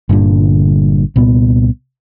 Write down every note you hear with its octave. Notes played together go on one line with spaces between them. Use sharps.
G1 G2 A#2 D3
C2 A#2 B3